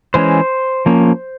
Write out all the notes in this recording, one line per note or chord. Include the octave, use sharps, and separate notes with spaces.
E3 G#3 C#4 C5
F3 A#3 C#4